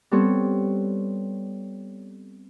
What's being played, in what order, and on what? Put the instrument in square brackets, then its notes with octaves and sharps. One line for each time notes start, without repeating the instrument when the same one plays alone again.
[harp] G3 B3 C4 A4 C#5